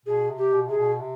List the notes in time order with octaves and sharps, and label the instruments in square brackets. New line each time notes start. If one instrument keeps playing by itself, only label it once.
[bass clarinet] B2 [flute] G#4
[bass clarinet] C3
[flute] G4
[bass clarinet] B2
[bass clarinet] C3 [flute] G#4
[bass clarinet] B2
C3